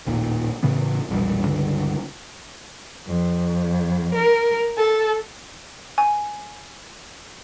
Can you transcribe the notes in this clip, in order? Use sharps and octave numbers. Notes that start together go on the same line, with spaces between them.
A1 D#2 A#2 D#3
A2 C#3 E3 B3
E1 A#1 E2 G3
C#2 G2 D3
F2
A#4
A4
G#5